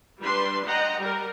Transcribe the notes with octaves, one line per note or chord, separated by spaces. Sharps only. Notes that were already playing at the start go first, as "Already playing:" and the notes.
G3 D4 B4 C6
D#5 F#5 G5 A#5
G3 A#4